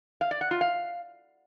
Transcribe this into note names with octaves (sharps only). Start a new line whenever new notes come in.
F5
D5
F#5
F4
F5